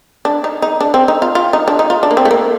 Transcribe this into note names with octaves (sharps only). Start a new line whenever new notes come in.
D4
D#4
D#4
D4
C4
D#4
F4
F4
D#4
D4
D#4
F4
D4
A#3
C4
A3
A#3